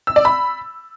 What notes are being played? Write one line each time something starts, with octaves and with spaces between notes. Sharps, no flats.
E6
D5
B5